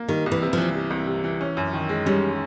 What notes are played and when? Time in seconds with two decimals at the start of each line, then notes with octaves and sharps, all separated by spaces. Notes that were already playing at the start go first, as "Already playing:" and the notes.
Already playing: A#3
0.08 D#3 G3
0.26 C2
0.32 E3
0.42 C3
0.53 E3 F3
0.75 G3
0.90 C2
1.07 C3
1.24 E3
1.41 C#4
1.57 F#2
1.73 D#3
1.89 G#3
2.06 G3 C#4